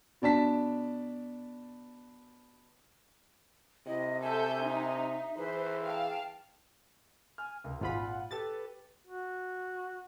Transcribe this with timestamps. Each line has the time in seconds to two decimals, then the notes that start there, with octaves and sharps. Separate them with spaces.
0.22 B2 D4 A5 B6
3.87 C3 E4 D#5
4.22 A4 E5 G#5 G6
4.63 D#4
5.37 E3 G#4 B4 C5
5.85 F5 G5 A5
7.38 G#5 F6
7.64 C#2 A#4
7.81 G#1 A#2 F4 F#5 G#5 B5
8.31 G4 A4 B4 A6
9.07 F#4